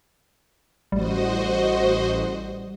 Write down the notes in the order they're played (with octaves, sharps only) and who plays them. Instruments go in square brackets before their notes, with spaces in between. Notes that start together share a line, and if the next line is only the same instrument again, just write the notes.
[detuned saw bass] A1 [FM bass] G3 [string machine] F#4 C5 D#5